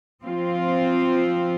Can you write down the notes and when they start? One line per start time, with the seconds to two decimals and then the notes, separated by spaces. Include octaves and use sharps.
0.25 F3 C4 F4